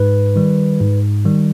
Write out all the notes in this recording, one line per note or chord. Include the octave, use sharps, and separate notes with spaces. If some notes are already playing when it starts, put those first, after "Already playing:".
Already playing: G#2 B4
D#3 G3
G#2
D#3 G3